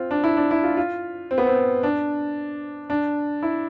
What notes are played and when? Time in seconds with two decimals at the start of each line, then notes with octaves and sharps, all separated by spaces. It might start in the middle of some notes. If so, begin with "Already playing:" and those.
Already playing: C4 F4
0.11 D4
0.24 E4
0.37 D4
0.51 E4
0.63 F4
0.77 F4
1.31 C4
1.38 B3
1.47 C4
1.83 D4
2.90 D4
3.43 E4